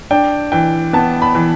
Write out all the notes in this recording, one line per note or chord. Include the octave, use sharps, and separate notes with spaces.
D4 G5
E3 G5
B3 A5
B5
E3